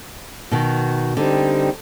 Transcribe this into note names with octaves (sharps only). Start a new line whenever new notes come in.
B2 D#3 F#4
D3 G3 C4 D#4